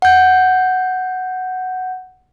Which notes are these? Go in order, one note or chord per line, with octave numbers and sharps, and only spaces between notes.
F#5 G6